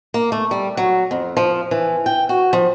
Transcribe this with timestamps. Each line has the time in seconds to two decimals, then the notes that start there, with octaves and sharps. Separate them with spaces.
0.14 A#3
0.32 A3
0.51 G3
0.77 F#3
1.11 F2
1.37 F3
1.71 E3
2.06 G5
2.29 F#4
2.53 F3